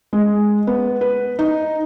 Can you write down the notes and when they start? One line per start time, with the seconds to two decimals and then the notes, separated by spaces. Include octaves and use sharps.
0.13 G#3
0.67 B3
1.01 B4
1.39 D#4